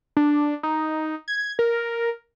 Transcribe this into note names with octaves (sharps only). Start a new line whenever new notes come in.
D4
D#4
G#6
A#4